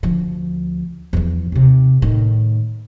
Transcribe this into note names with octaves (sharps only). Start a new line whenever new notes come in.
D2 F3
E2 F3
D#2 C3
A2 D#3